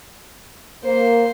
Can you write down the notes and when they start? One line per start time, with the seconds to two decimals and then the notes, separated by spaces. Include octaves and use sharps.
0.84 A#3 C5